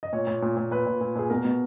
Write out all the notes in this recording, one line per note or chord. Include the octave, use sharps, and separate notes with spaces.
D#5
A#2 C#5
A#2
A#2
A#2
A#2 B4
A#2
A#2
A#2 G#4
B2 A#4
B2